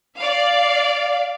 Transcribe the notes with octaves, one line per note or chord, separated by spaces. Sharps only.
D5 F5